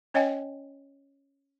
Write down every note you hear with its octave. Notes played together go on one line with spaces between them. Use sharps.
C#4 C#5 D#5 G5 G#5